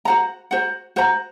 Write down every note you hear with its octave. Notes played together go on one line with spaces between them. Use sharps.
F#4 C5 F#5 A#5
F#4 C5 F#5 A#5
F#4 C5 F#5 A#5